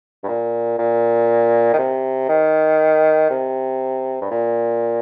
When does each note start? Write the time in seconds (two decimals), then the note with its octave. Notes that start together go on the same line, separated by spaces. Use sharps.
0.23 G2
0.28 A#2
0.78 A#2
1.73 D#3
1.78 C3
2.28 D#3
3.30 C3
4.21 G2
4.31 A#2